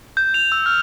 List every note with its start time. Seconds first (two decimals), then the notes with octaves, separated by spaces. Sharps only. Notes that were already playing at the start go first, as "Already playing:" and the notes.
0.17 G6
0.34 F7
0.52 E6
0.66 F6